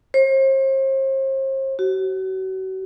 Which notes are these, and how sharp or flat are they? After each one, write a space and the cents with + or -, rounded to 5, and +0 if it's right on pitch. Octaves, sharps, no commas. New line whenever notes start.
C5 +40
F#4 +40